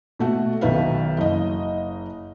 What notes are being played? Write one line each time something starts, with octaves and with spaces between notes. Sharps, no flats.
B2 A3 F#4
B1 B2 D#3 B4 E5 F5
F#1 D#5